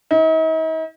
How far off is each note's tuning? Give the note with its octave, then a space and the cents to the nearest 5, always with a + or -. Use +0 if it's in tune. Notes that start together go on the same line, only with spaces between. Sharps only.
D#4 +45